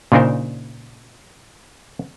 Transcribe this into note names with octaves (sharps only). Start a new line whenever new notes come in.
A#2 C#3 D4 D#4 A#4 C5